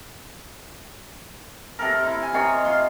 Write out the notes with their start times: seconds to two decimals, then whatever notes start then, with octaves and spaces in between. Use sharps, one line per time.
1.79 C3 A4 A#4
2.06 E4
2.23 G#5
2.34 C3 D#3 C#5
2.65 F4 C6